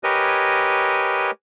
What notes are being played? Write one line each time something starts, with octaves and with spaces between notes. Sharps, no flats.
G4 A#4 B4 C#5 D#5 G#5